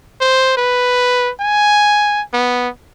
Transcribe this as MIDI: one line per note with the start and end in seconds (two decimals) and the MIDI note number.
0.21 0.54 72
0.57 1.31 71
1.40 2.22 80
2.33 2.69 59